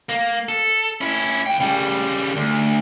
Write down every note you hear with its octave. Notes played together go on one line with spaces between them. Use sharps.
A#3
A4
C#4 E4
D#2 G5
C#3 G3
D2